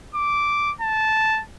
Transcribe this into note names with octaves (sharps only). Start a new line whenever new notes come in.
D6
A5